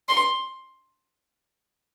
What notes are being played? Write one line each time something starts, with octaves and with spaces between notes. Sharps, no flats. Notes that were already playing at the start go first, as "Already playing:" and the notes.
C6